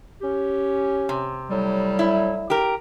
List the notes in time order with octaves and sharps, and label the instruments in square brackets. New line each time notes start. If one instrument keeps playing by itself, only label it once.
[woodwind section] C#4 G4
[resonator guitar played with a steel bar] C3
[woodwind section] A2 F#3 G3
[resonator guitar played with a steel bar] E4
G4 A#4